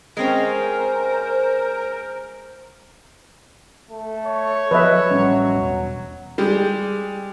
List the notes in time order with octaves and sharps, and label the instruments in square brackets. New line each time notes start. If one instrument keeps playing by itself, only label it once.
[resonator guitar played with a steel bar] G#3 C4 C#4 [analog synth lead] A#4 [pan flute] C5
[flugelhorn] A3
[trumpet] C#5
[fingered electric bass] F3 F#3 [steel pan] B4 D#5 E5
[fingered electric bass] A1 G3 C#4 [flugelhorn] F#3
[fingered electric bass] E1
[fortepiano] G3 G#3